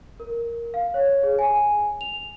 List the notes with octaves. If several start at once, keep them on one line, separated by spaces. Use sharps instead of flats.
A#4
F5
C#5
G#4
G#5
F7